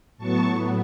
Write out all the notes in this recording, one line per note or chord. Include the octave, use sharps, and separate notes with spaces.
A2 F#3 B3 A5 C#6